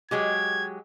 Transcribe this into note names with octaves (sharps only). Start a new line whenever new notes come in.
F#3 G#3 G4 G#6